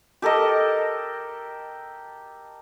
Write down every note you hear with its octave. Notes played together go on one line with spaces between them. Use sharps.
G4 A4 A#4 D#5